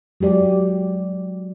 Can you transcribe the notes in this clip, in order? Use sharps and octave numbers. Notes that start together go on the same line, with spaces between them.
F#3 G#3 G4 D5